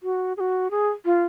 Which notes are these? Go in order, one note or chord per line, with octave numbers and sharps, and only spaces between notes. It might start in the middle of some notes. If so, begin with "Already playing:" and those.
F#4
G#4
F#4
G#4
F4